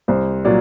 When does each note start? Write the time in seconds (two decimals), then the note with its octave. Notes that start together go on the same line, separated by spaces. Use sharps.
0.08 C2 C5
0.45 A#2 F#3 D5